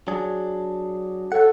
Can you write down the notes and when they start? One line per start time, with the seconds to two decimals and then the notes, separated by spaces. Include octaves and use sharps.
0.08 F#3 D4 G#4
1.32 A4 C#5 F#5